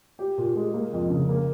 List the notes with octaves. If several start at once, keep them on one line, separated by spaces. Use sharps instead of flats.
G4
A#2
G#3
A#3
F2
C#3
A#3